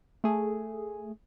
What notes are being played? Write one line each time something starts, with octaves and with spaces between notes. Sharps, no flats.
A3 G#4